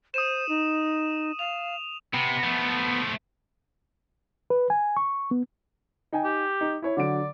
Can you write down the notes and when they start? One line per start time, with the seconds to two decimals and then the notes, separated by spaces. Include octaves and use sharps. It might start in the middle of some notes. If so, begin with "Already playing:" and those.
0.14 C5 D#6 D#7 E7
0.49 D#4
1.39 F5 F7
2.14 C3 B3
2.44 F3 A3
4.50 B4
4.70 G#5
4.97 C#6
5.31 B3
6.13 D#4 G5 G#5
6.24 G4
6.61 D#4
6.82 E4 C#5
6.97 D3 F#3 D5 D7